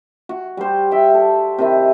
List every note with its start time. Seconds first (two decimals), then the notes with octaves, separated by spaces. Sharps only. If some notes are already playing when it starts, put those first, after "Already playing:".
0.29 F#4
0.57 G3 C5
0.91 E5 G5
1.14 A4
1.58 C3 D#3 E4